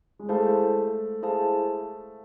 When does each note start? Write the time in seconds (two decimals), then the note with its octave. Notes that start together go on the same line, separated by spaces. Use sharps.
0.19 G#3
0.29 A3 E4 G#4 C5 F5 A5
1.22 E4 G#4 C5 F5 A5